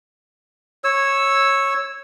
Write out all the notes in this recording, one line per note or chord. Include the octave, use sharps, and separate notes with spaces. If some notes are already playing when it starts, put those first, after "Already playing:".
C#5 E6